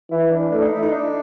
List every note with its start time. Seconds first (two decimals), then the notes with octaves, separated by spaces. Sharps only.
0.11 E3 E4
0.31 D4
0.52 A3 D4
0.62 D#4
0.72 E4
0.82 D#4
0.92 D4